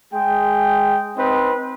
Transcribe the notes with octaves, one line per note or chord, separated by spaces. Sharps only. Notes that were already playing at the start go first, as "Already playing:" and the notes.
G#3 G#4 G5
C4 D#4 B4 C5